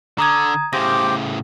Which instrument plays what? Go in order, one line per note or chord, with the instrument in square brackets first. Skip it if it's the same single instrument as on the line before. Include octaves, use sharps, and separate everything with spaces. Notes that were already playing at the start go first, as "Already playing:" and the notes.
[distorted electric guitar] D3 [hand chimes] A#5 D#6 G#6
[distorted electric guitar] A2 C#3 [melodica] G4 C5 D6 [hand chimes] A#6